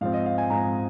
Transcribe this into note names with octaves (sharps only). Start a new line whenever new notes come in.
G#2 F3 C4 F5
D#5
F5
G#5
G#2 F3 C4 A#5